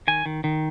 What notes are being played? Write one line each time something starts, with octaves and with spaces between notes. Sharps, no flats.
D#3 G#5
D#3
D#3